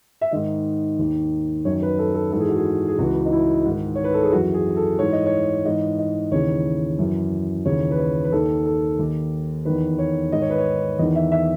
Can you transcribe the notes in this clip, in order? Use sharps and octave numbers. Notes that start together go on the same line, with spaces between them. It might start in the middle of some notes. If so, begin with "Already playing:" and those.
E5
G#2 D#3 D#5
D#2 D#3
F#2 D#3 C#5
B4
A4
A4
G#2 E3 G#4 A4
F#4
G#4
G#4
C#2 C#3 E3 F#4
D#4
E4
G#2 D#3
C#5
B4
A4
G#4
F#2 E3 F#4
G#4
A4
G#2 E3 C#5
D#5
C#5
G#2 E3 D#5
D#5
D#2 C#3 E3 C#5
F#2 E3
D#2 C#3 E3 C#5
B4
C#5
B4
D#2 D#3 A4
A4
D#2 D#3
E2 D#3 B4
C#5
G#2 D#3 D#5
C#5
B4
C#5
E2 D#3 D#5
E5
E5